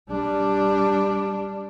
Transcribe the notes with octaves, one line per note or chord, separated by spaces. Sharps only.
G3 D4